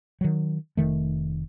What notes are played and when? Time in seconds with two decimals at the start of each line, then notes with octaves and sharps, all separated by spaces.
0.21 D#3 F#3
0.77 F1 D#3 A3